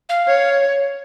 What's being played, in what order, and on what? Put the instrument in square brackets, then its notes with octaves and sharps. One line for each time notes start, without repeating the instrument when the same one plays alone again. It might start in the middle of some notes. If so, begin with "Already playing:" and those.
[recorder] F5
[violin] C#5